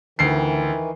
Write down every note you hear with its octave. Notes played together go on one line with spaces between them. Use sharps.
D2 D#3 E3 C7